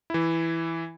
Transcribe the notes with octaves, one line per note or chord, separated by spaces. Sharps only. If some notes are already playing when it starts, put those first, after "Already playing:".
E3 E4